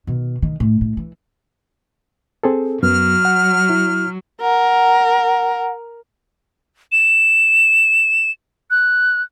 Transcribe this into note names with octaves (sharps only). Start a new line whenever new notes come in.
B2 D#3
D#3
A2
A2
E3
C4 G#4 A4
F#2 F#3 B3 F6
F#5
E4
A#4 F#5
E7
F#6